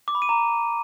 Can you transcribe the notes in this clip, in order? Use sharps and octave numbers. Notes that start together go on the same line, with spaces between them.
D6
B5
D#7
A#5